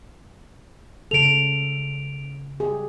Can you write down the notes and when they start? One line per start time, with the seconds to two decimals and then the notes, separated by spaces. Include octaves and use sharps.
1.11 C#3 A4 D7 F7
2.60 G4 G#4